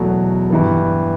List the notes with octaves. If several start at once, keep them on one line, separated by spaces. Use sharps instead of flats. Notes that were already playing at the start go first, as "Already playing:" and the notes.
Already playing: E2 B2 F#3 A3
G2 E3 B3